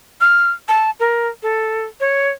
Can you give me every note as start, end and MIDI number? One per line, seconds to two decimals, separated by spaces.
0.21 0.50 89
0.68 0.91 81
1.00 1.28 70
1.43 1.84 69
2.00 2.29 73